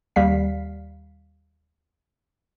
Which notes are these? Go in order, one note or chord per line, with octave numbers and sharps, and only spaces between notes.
D#2 G3 F5 B6